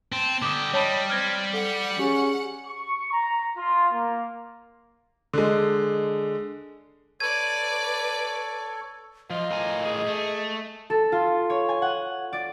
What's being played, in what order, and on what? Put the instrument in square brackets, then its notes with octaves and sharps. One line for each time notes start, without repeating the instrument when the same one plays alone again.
[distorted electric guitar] C4 [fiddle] A5
[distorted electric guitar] D3 G4 [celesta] D6 D#6
[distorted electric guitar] G3 [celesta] C#5 A5 B5 [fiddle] D#5
[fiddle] C4 [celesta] F6 G#6 A#6
[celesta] A4 [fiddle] F#5
[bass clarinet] C#4 [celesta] G4 G#4
[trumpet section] C#6
A#5
F4
A#3
[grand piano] D3 G#3
[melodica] A4 C#5 [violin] B4 D5 [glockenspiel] G#6 D#7
[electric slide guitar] F3 [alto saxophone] F4 [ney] D#5
[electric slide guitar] A2 A#4 G#5
[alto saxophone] G#4
[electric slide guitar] A3
[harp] A4
F4
C#5
G#5
F#5
D5